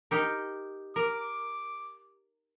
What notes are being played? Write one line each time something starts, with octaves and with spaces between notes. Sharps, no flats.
D#4 G4 A#4
A#4 D6